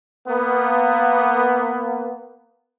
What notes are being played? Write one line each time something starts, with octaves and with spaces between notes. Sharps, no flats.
A#3 B3